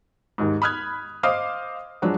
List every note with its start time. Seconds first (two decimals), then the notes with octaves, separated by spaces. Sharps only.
0.38 D#2 G#2
0.62 B5 D#6 F6 F#6 G#6
1.23 C5 D#5 F5 D6 D#6 F6
2.02 F3 F#3 G#3 D4 F#4